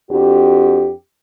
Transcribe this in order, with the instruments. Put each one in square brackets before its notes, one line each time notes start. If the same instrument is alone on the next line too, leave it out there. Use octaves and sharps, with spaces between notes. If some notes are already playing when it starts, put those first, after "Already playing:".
[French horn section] F2 D4 F#4 G4